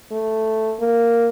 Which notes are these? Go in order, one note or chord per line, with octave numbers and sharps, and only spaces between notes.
A3
A#3